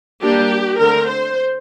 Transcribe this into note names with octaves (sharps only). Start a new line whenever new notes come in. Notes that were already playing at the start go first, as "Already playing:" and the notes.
G3 A#3 D4 G4
D3 A3 C4 A#4
C5